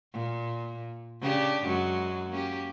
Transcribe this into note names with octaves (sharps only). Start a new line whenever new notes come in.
A#2
C#3 D4 G4
F#2 F#3 G#3
A#3 C#4 G4